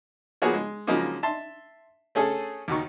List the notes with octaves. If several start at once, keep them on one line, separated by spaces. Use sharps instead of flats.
F3 A#3 B3 F#4 G#4 C#5
G#3
C#3 F3 F#3 G#3 A#3 D#4
E5 A5 C6
A3 C#4 G#4 A4
D#2 B2 D#3 C#6